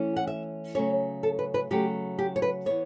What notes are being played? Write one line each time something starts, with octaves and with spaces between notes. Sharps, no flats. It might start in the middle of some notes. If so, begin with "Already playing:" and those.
Already playing: E3 A3 C#4
F#5
E5
C#3 F#3 A3 C#4 C#5
A4
B4
B4
C#3 F#3 A3 G4
G4
C#5
B4
E3 B3 C#5